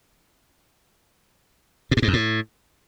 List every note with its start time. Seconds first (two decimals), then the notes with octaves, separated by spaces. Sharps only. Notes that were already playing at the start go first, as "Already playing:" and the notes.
1.91 A2
1.97 G2
2.02 G#2
2.08 F2
2.13 A2